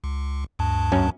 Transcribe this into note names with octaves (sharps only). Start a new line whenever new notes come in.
C#2
D2 G2 A5
F#2 C#4